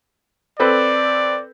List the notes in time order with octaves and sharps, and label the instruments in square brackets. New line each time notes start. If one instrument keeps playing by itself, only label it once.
[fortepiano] C4 A4 B4 [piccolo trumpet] D5